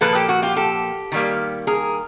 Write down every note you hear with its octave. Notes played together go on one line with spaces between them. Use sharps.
A#2 F3 A#3 A4 B4
G4 A4
F#4
F4 G4
G4 A4
D#3 G3 A#3
G#4 A#4